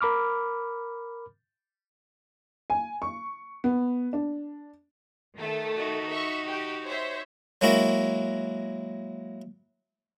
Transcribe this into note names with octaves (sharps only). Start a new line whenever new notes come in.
A#4 B5 D6 F6
G#5
C#6
B3
D4
D#3 A3 A4
D#4 F#4
E5 C#6
G4
C5 C#5 E5
F#3 G#3 A#3 E4 F#4